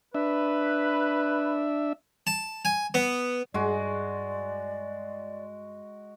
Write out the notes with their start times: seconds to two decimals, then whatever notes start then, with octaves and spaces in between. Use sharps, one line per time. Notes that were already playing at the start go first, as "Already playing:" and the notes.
0.15 D4 B4 E5
2.27 A5
2.65 G#5
2.94 B3
3.54 G2 G#3 F#4 D5